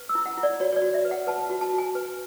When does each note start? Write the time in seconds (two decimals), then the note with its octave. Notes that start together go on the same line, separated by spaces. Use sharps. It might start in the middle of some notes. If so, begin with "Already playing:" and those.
Already playing: B4
0.09 E6
0.15 E4
0.26 F#5
0.37 E4
0.43 D5
0.60 F#4 C#5
0.72 C#5
0.76 D5
0.82 F#4
0.94 E5
1.05 B4
1.11 F#5
1.27 B4 A5
1.50 F#4
1.61 A5
1.73 F#4
1.78 G#5
1.95 B4